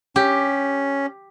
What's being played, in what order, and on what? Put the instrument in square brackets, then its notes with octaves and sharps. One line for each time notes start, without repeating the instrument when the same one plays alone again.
[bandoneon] C#4 [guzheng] G4